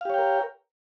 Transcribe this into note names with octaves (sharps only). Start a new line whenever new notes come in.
G4 A#4 C#5 F5 G5